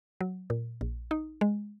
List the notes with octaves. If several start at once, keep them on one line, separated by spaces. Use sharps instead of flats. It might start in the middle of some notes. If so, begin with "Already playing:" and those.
F#3
A#2
A#1
D#4
G#3